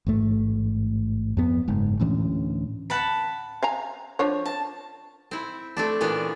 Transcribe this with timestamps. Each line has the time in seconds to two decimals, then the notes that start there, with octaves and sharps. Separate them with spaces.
0.07 A1 G#2 A3
1.37 F2 B3
1.68 F#1 G#2
2.00 D2 A2 E3 C#4
2.90 F#5 A5 B5
3.62 F5 G#5 A#5
4.19 F3 D4 C#5
4.46 A5
5.31 C4 E4
5.77 A3 C4 D4
6.01 A#2 E3 B3 C#4 D4